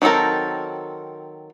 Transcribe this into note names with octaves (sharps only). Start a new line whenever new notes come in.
D#3 F#3 C4 A4 A#4